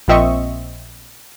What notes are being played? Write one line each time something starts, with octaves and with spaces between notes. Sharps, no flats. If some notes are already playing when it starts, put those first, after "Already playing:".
A#1 A#2 C4 D#5 E5 C#6